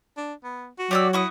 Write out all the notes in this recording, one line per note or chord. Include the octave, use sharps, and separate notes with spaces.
D4
B3
F#4
F#3 G4 D5 E6
E4 F#4 C#6 D#6